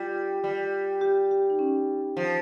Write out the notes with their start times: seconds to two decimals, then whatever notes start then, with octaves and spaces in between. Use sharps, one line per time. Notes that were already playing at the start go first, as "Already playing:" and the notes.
Already playing: G3 F4
0.44 G3
1.01 G4
1.31 G4
1.50 D#4
1.59 C#4
2.17 F3